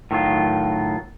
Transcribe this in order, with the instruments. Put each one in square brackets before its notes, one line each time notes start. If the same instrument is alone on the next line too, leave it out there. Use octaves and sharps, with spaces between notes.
[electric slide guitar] A2 D#3 F#3 F4